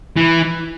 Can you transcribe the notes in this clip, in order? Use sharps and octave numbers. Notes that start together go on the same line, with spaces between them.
E3